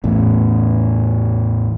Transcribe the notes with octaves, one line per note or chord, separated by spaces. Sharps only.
A1 E2 A2